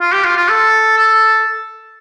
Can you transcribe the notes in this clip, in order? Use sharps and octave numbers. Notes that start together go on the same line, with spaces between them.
F4
G4
F4
F4
A4
A4